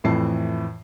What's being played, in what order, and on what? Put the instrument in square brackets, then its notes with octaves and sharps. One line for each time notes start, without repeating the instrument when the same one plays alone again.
[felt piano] F2 A2 E3 A5 C7